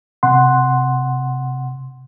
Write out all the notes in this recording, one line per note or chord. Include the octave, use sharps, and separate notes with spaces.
C3 F#5 C6